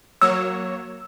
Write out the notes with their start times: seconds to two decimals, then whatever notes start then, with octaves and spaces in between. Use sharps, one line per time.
0.22 F#3 A#3 C#5 E6